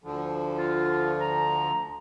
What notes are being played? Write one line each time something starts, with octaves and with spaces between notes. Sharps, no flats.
D2 D3 F3
F4
A#5